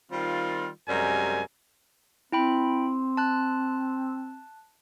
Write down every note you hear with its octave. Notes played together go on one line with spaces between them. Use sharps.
D#3 G3 C4 F4
F#2 C3 G3 G#3 A#4 G#5
C4 E4 G5 B5
A5 F#6